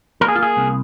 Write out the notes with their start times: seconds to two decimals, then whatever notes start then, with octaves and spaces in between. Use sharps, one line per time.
0.21 A#3 A#4
0.28 G#4
0.36 F4
0.39 A#3 G#4
0.57 C2